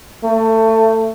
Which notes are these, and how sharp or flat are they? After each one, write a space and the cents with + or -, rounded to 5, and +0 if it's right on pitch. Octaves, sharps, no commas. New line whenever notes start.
A3 +20